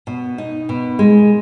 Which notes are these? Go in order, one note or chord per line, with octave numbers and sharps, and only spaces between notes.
B2
D#4
B2
G#3